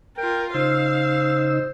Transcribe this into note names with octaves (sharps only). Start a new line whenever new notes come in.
F4 A#4 G5
C#3 D#4 C5 F5 E6